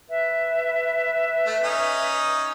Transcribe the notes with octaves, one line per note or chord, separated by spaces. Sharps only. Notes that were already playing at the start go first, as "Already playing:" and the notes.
B4 E5
A3
C#4 D#4